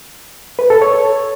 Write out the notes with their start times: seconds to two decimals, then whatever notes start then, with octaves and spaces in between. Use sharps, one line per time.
0.59 B4
0.70 A4
0.82 C#5